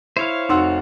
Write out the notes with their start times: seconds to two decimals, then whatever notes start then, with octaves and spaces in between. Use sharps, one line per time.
0.17 E4 C5 C#5 F5
0.49 F1 D#4 F#4 F#5 C6 E6